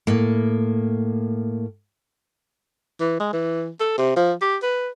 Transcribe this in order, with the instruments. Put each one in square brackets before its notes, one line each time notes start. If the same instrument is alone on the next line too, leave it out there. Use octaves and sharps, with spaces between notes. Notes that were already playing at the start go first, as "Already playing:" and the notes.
[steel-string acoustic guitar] A2 A#3
[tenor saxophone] E3
G#3
E3
A4
C3
F3
G4
B4